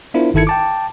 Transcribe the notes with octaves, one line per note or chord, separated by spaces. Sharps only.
B3 D4 E4 F4 A#4 C5
G1 D#3 E4 A4 G#6 C#7
G5 A5 D6